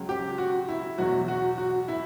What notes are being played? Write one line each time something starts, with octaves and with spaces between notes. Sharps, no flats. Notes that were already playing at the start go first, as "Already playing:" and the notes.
Already playing: C#2 C#3 F#3
G4
F#4
E4
E2 B2 F#3 F#4
F#4
F#4
E4